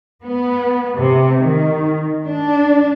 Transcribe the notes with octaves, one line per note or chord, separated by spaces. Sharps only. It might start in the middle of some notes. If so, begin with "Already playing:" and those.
B3
C3
D#3
D4